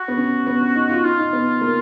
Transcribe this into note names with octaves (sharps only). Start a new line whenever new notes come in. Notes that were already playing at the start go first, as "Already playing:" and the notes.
Already playing: F#4
B3
C#4
B3
C#4
D#4
F4
D#4 F4
D#4
B3
A#3